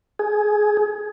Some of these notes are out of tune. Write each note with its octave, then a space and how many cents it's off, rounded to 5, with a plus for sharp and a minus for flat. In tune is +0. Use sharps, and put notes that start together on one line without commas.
G#4 +15